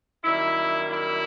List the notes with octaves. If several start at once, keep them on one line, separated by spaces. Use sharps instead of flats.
F#2 D#3 G3 A#3 E4
E4